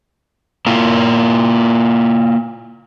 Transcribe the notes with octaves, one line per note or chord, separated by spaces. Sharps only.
A#3 E4 F4 A#4